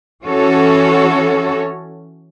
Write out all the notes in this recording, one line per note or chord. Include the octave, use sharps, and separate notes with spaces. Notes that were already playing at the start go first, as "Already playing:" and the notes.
E3 C#4 F#4 A4 C#5